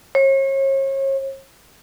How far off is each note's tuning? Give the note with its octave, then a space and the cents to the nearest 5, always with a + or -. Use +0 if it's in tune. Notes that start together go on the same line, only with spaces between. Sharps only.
C#5 -40